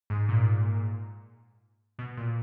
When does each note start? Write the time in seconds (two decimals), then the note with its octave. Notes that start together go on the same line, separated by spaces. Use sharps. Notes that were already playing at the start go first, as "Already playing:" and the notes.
0.10 G#2
0.29 A#2
1.99 B2
2.17 A#2